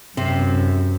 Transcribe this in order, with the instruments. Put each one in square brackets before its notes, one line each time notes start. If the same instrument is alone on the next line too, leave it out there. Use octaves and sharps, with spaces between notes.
[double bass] F#2 [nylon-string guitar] C3 C4